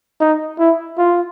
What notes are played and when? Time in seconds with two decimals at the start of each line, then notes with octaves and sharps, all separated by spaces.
0.20 D#4
0.59 E4
0.98 F4